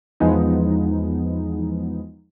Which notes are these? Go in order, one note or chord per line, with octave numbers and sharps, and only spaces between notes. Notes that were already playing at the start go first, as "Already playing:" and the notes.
E2 F3 G#3 B3 D#4